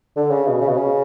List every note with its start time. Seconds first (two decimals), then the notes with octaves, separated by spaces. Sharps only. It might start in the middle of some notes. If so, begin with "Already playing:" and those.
0.16 D3
0.31 C#3
0.47 B2
0.61 C#3
0.68 B2
0.77 C#3